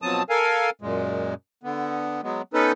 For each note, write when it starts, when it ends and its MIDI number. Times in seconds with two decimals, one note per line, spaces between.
0.02 0.23 47
0.02 0.23 53
0.02 0.23 54
0.02 0.23 60
0.02 0.23 81
0.02 0.23 87
0.30 0.70 69
0.30 0.70 70
0.30 0.70 77
0.30 0.70 80
0.82 1.34 42
0.82 1.34 46
0.82 1.34 56
1.63 2.21 50
1.63 2.21 59
2.23 2.42 54
2.23 2.42 56
2.23 2.42 59
2.54 2.72 59
2.54 2.72 61
2.54 2.72 63
2.54 2.72 69
2.54 2.72 71